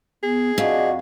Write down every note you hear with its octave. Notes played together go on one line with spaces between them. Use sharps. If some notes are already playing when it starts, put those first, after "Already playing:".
B3 G#4
F2 D4 F#4 D#5